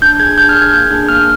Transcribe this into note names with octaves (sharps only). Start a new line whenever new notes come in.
D4 G6
G#4 G#6
D4 G6
F6
G#4
G#6
A#3 G6
D4 G#4
A#3 F6